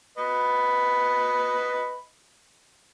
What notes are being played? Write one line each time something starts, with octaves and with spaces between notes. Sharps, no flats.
B4 D#5 B5